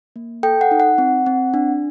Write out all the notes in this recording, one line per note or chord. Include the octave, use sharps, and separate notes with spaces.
A#3
A4 G5
F#5
D#4
F#5
C4
C4
D4